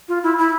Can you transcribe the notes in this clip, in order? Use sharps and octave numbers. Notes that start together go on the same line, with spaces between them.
F4
E4
E4